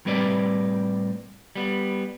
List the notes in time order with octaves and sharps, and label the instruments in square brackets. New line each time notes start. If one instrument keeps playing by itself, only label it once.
[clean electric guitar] A2 G3 C4 A#4 B4 D5
G3 B3